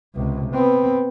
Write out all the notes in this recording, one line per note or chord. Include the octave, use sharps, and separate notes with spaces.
C#2 C3
B3 C4